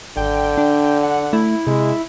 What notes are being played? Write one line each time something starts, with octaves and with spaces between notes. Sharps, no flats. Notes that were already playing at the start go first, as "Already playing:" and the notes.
G#1 D3 G5
D4
F#5
A3 E4
C3 G#3